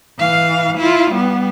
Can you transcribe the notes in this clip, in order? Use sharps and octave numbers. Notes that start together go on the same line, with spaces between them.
E3 F5
E4 F4
G3 B3